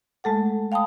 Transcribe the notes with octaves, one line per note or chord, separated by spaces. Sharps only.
G#3 A3 A4 F#5
F5 G5 A5 B5 D#6